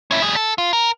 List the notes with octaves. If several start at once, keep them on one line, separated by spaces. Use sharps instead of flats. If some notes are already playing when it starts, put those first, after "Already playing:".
C#4 E4
G3 G#4
A4
F4
A#4